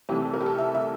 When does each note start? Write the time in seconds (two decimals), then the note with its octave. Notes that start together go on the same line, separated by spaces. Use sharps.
0.09 C2 C3 E3 A3 G4
0.22 A4
0.34 A#4
0.41 G4
0.46 A4
0.58 E5
0.75 E5